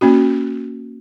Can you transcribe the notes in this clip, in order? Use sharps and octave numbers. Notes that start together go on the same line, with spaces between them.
A#3 C#4 F#4